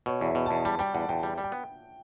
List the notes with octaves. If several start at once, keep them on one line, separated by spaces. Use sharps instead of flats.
B2 C#5
E2 E5
B2
E2 A5
G3 A5
G3 G5
E2 F#5
E2 G5
G3 G5
G3
G5
B3